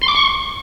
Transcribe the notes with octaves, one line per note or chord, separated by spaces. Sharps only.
C6
D6
C#6